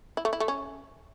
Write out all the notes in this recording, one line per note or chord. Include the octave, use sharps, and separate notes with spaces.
E4
A3
E4
A3
C#4